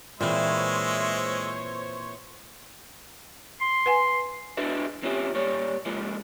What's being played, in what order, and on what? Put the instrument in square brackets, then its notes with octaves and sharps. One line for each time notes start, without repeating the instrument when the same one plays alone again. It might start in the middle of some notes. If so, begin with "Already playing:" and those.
[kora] A#2 [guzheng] E3 C4 [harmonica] G#3 E5 [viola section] C5 C#5
[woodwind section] C6
[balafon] B4 F#5 G#5
[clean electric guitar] D4 F#4 G#4 B4 D#5 E5
D#2 C4 C#4 F4 G4 E5
A#2 G3 C#5
C#3 F3 G#3 A#3 F4